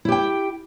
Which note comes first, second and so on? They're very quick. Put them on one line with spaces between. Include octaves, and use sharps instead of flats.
E4 G4 G5